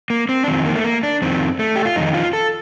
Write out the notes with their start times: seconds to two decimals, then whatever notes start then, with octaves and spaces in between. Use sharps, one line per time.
0.10 A#3
0.29 C4
0.43 D4
0.48 F2 D#3 C4
0.65 A#3
0.76 A3
0.84 A#3
1.03 D4
1.22 F2 D#3 C4
1.59 A3
1.76 G4
1.85 F4
1.96 F2 D#3 D#4
2.14 F4
2.33 A4